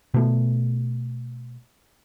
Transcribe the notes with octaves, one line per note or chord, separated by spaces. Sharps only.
B2 A3